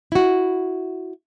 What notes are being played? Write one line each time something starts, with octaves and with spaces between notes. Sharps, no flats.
E4 F#4